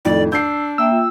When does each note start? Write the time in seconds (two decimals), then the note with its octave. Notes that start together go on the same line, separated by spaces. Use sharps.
0.05 F2 A2 D#3 D5
0.32 D4 E6 G6 C7
0.78 A#3 E5 G5 E6
0.91 F4